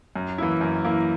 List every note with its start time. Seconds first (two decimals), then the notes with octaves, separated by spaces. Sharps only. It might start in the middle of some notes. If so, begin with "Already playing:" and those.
0.16 F#2
0.38 E3 A#3 E4
0.61 F#2
0.85 E3 A#3 E4